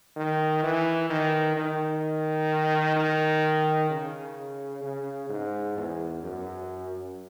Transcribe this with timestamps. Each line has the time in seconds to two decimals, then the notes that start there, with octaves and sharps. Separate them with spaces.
0.16 D#3
0.63 E3
1.10 D#3
1.56 D#3
2.96 D#3
3.90 C#3
4.84 C#3
5.29 G#2
5.77 E2
6.23 F#2